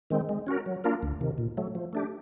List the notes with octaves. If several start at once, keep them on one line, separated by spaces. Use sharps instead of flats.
D#3 G#3 C4
G#3
C#4 F#4 A#4
F#3
A#3 D4 F4 A#4
D2
C3 D#3
A#2
F#3 A3
F3
A3 D4 G4